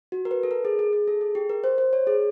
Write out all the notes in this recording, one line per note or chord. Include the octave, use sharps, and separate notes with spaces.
F#4
A#4
B4
A4
A#4
G#4
G#4
G#4
A4
G#4
G4
A#4
C5
C5
C#5
G#4